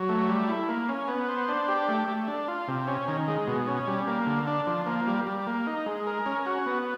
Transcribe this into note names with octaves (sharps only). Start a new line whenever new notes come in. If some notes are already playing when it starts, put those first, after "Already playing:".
Already playing: F#3
A3
G3
E4
A#3
C#4
B3
C5
D4
G4
A3
A3
D4
F4
C3
C#4
D#3
G#3
B2
C#4
G3
A#3
D3
D4
F3
A#3
G3
G3
A#3
D#4
G#3
A#4
C#4
F#4
B3